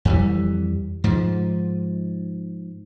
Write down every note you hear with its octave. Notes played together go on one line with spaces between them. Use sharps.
F2 E3 G3
G#2 F3